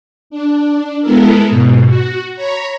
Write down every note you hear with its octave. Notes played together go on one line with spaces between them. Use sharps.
D4
G#3 B3 E4 A4 A#4
G#2 B2
F#4
C#5 A#5 B5